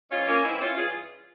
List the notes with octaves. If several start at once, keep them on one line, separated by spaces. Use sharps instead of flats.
G#2 E3 C#4 F4
A#3 C#4
G#2 E3 C4 E4
C#4 F4
G2 E3 F4 G#4